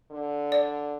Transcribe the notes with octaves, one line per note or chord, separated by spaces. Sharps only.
D3
D5